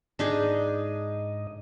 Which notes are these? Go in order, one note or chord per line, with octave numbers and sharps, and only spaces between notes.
G#2 D4 D#4 G#4 D#5